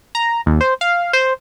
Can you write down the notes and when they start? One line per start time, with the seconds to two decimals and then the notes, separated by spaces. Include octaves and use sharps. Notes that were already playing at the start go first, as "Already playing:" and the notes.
0.15 A#5
0.46 D#2
0.61 C5
0.81 F5
1.13 C5